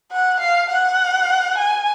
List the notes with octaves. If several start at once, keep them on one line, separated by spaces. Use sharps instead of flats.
F#5
F5
F#5
G#5